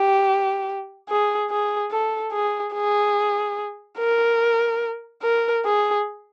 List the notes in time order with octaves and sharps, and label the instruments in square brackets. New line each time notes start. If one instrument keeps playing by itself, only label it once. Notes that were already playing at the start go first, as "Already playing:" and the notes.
Already playing: [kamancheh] G4
G#4
G#4
A4
G#4
G#4
A#4
A#4
G#4